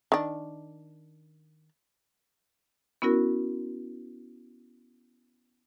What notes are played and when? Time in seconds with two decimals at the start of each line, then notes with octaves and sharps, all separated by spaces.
0.12 D#3 D4
3.02 B3 C#4 E4 F#4 A#4